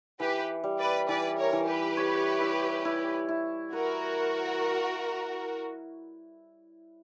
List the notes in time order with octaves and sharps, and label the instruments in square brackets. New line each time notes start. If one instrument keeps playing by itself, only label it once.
[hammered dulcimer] E3 [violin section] G4 B4
[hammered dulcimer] G3
[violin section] B4 D5
[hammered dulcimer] E3 [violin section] B4 D5
[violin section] A#4 C#5
[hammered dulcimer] E3
[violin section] G4 B4
[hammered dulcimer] C#5
E4
E4
E4
[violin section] F#4 A#4 [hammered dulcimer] B4